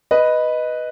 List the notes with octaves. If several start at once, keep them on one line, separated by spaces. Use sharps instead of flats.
B4 D#5